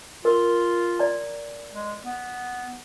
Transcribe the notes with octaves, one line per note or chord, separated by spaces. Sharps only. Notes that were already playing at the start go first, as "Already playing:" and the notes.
F4 A#4
D5 A#5
G#3
B3